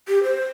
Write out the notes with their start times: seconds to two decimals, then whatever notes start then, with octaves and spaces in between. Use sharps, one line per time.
0.08 G4
0.23 C5